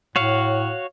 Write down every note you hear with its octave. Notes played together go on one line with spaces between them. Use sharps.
A2 F#4 C#5 F5